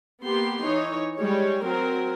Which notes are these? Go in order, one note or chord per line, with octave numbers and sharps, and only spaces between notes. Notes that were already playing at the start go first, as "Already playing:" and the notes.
A#3 B3 G4 C6
E3 D#4 C#5
G3 G#3 C#5
F#3 C4 A#4